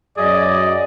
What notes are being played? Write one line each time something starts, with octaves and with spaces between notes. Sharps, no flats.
F#2 F#3 G#4 D5 D#5